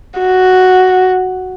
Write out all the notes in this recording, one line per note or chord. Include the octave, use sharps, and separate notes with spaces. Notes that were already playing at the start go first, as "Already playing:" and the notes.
F#4